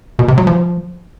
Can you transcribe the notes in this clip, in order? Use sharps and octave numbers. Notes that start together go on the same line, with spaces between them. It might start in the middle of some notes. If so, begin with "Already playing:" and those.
B2
C3
F#3
F3